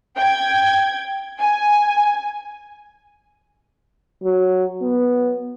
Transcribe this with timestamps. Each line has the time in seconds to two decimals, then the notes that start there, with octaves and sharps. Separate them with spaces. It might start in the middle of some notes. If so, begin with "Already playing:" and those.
0.17 G5 G#6
1.39 G#5
4.23 F#3
4.82 B3